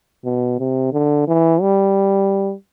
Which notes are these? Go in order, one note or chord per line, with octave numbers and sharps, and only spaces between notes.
B2
C3
D3
E3
G3